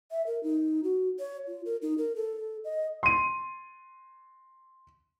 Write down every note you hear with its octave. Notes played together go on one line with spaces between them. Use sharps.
E5
A#4
D#4
F#4
C#5
F4
A#4
D#4
A#4
A4
D#5
C6 D#7